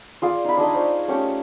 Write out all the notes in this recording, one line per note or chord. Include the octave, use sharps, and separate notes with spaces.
F4 G#4 D5 F5
D#4 B5
D4 D#4 G#4 D#5
C5 C#5
A3 C#4 G4